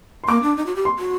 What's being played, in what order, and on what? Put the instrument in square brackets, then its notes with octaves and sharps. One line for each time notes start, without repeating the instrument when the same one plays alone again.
[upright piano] C6
[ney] A#3 [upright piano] D6
[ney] D4
D#4
F#4
G4
[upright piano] C6
[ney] F#4